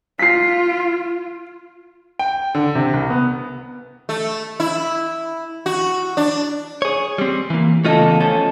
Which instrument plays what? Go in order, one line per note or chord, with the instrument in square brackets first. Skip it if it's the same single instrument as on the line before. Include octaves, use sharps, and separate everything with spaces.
[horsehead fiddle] F4 [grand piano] B6 C7
[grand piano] G5
D3
C3
C2
B3
[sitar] A3
E4
F#4
D4
[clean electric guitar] G#4 C#5
G3 C4
E3 A#3
[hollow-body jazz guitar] E2 C#3 A4 [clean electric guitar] A3 F4 D#5
[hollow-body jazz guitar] F3 C#4 A4